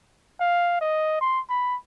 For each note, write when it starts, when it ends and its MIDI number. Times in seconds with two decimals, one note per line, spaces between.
0.40 0.79 77
0.81 1.17 75
1.21 1.40 84
1.49 1.76 83